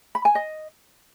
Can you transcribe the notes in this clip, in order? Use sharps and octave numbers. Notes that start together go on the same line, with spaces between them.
B5
G#5
D#5